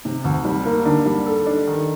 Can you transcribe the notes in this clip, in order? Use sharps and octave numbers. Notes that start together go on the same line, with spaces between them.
C3
D2
G3
A#3
D3
G3
A4
D4
D#3